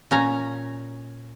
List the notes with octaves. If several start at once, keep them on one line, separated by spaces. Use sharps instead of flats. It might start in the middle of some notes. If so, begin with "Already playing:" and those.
A#2 C#4 A#5